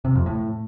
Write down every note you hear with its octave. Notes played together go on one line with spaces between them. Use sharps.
C3
F2
A2